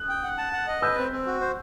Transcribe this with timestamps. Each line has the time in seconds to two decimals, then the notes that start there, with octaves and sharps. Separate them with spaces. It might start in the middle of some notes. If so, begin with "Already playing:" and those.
Already playing: D#6 F#6
0.09 G5
0.24 F#5
0.38 A5
0.53 F#5
0.67 D#5
0.82 B4 E6 G6
0.98 C4
1.12 C4
1.26 F#4
1.41 C5